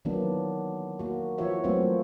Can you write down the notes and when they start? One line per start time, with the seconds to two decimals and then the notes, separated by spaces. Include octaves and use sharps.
0.05 D#3 E3 F#3 A#3 B3 D4
0.99 A#3 F#4
1.38 E3 F3 F4 F#4 C#5 E5
1.64 F#3 A3 A#3 C4 F4